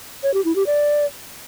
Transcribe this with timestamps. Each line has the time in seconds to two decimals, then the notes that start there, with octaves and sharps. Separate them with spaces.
0.23 C#5
0.34 G4
0.45 E4
0.56 G4
0.66 D5